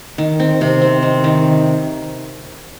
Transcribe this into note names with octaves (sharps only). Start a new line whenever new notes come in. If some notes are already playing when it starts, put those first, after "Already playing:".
D#3
C4
C3
C4
D#3
D#3